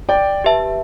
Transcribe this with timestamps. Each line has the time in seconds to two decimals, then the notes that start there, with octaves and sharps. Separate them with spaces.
0.09 D5 G5
0.44 G4 B4 E5 A5